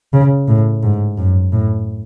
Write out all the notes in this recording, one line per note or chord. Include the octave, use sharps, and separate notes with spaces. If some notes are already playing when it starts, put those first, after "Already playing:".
C#3
A2
G#2
F#2
A2